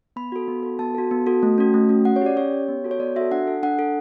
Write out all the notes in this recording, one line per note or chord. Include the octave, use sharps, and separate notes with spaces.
B3 B5
F#4 A4
B3
F#4 A4
B3 A5
F#4 A4
B3
F#4 A4
A3
C#4 F#4
A3
C#4 F#4
C#4 F#5
C#5
G4 D5
C#4 C#5
G4
B3
F#4 A4
C#5
B3 D5
F#4 A4 E5
D4 F#5
A4
D4 F#5
A4